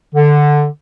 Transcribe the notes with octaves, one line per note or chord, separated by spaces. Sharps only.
D3